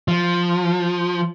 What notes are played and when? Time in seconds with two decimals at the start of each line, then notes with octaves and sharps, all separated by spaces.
0.08 F3